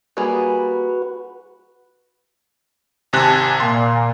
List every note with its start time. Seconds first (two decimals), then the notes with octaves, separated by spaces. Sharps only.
0.17 G3 A#3 F#4 G#4 B4
3.13 G#1 C3 G#5 A5 F#6
3.60 A#2 C6